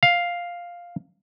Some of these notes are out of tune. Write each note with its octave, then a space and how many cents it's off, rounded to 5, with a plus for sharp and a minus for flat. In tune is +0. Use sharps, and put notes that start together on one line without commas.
F5 +5